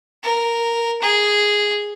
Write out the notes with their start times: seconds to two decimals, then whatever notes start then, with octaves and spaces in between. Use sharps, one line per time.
0.24 A#4
1.02 G#4